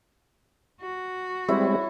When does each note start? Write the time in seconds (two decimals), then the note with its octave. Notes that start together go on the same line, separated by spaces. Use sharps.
0.82 F#4
1.49 G3 G#3 C4 E4 C#5